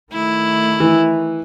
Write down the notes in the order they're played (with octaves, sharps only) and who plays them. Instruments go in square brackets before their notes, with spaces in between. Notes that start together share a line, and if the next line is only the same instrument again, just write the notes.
[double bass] D#3 A3 [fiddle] E4
[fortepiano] E3